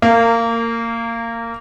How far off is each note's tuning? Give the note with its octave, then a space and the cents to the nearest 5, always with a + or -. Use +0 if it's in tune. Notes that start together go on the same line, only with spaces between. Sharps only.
A#3 -20 A#4 -30